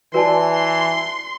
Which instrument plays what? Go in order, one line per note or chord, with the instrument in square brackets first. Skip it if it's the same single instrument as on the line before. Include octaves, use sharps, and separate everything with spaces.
[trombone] E3 [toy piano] F#4 C#5 D5 [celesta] B4 G#5 A5 [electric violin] C6